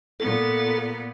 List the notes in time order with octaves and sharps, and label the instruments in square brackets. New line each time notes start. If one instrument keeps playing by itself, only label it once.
[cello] A#2 B3 [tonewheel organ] A4